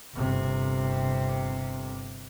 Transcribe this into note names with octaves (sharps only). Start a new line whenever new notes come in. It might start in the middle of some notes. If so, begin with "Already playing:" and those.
G1 C3